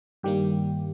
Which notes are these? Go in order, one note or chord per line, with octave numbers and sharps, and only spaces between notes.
G2 D#3 G3 A#3 G4